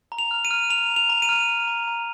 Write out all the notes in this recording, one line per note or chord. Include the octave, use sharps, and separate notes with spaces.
A#5
F7
F6
D#7
F6
A#5 F7
A#5
F7
A#5
D#7
F6
A#5
A#5
A#5